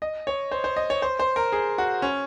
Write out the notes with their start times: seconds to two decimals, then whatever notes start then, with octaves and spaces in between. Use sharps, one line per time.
0.02 D#5
0.27 C#5
0.51 C5
0.64 C5
0.76 D#5
0.90 C#5
1.02 C5
1.19 C5
1.36 A#4
1.52 G#4
1.78 F#4
2.02 C#4